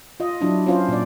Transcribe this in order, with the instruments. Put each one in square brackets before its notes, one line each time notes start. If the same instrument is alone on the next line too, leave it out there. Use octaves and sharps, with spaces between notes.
[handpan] F4 D#5
F#3 D4 E4
C#4 F4 C5
A#2 D5